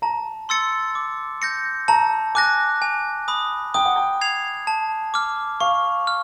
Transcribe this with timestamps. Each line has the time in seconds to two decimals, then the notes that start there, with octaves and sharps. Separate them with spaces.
0.02 A5 A#5
0.49 C6 E6 A6 C#7
0.95 D6
1.42 G6 A#6 C#7
1.88 A5 A#5
2.35 G#5 D6 F#6 A#6
2.82 G#5
3.28 B5 D#6
3.74 G5 D#6
3.85 F#5
3.96 G5
4.21 G#6 C7 F7
4.67 A5
5.14 D6 F6
5.60 F5 C#6
6.07 F6